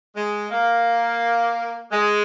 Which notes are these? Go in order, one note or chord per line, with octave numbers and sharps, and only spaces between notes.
G#3
A#3
G#3